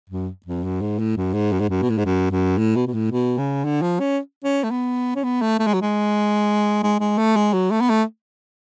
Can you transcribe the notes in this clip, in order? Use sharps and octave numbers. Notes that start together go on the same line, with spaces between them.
F#2
F2
F#2
G#2
A2
F#2
G#2
F#2
G#2
F#2
B2
A2
G#2
F#2
F#2
A2
B2
B2
A2
B2
C#3
D3
F3
C#4
C#4
A3
B3
C#4
B3
A3
A3
G#3
F#3
G#3
G#3
G#3
A3
G#3
F#3
A3
B3
A3